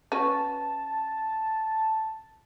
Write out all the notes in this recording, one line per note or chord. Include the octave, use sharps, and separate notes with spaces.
C#4 F#4 B4 A5